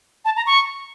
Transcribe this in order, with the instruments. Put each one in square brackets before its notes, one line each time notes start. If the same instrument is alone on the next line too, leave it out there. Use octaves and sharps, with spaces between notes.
[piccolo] A5
A#5
C#6